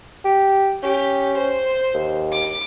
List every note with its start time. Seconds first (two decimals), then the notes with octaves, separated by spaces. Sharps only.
0.25 G4
0.83 C#4 G4
1.37 C5
1.94 D#2
2.33 D6